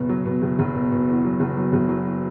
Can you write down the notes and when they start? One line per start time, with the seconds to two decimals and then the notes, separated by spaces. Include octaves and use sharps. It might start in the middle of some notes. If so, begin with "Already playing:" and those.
Already playing: F#1 B2
0.09 F#3
0.26 B2
0.42 F#1
0.59 F#1
0.75 B2
0.92 B2
1.08 E2
1.24 F#3
1.40 F#1
1.57 F#3
1.73 F#1
1.89 F#3